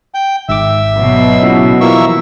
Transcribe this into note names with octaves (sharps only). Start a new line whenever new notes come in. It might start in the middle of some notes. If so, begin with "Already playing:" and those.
G5
G#1 G#2 E5 D6
B2 F#3
A#2 C#3 E4
E3 F3 A#3 E5 C#6